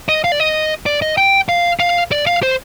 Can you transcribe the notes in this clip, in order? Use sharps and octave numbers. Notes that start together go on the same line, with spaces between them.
D#5
F5
D5
D#5
D5
D#5
G5
F5
F5
D5
F5
C5